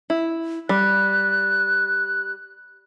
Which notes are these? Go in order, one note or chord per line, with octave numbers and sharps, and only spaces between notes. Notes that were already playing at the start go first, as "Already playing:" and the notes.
E4
G3 F#6